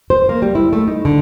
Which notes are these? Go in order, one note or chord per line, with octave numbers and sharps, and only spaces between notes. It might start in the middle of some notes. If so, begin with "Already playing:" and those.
C5
A#3
G3
E4
A3
D#4
D3